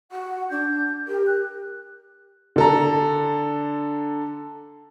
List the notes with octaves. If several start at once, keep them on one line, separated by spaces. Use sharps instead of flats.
F#4 F#5
D4 G6
G4 A#4
F#6
D3 A4 A#5